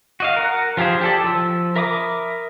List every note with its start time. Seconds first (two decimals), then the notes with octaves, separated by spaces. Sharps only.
0.20 F#4 D#5 F5
0.36 A#4 F#5
0.77 F3 F4 G4 G#4 C5
1.01 G4 A4 D5
1.24 F3 E6
1.76 A#4 E5 B5 D6 D#6